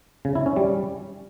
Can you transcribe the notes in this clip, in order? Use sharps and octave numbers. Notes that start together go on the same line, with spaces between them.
C#3
E4
C#4
G3